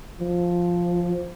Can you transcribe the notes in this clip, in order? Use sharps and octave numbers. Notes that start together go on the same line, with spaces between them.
F3